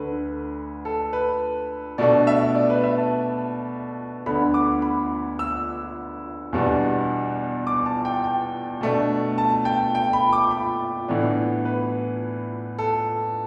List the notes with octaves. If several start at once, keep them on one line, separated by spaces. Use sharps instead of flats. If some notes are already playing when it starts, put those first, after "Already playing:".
Already playing: D2 D3 A3 D4 B4
A4
B4
B2 A3 D4 D5
E5
D5
B4
E5
A5
D2 D3 B3 D4 B5
D6
B5
E6
E2 B2 G3 B3 D4
D6
A5
G5
G5
B2 A3 D4
A5
G5
G5
B5
D6
B5
A2 E3 B3 D4
B4
A4